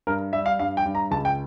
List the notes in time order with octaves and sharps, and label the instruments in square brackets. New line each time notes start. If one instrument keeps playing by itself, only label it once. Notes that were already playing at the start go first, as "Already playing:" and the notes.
[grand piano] G2 A#4
G3 E5
F5
G2 F5
G5
G2
A#5
C#2 A5
G5